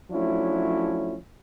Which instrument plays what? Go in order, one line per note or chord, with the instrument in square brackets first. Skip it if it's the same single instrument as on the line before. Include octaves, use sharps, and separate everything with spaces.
[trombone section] F3 F#3 A3 C#4 D4 E4